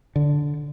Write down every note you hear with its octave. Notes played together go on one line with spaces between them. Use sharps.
D3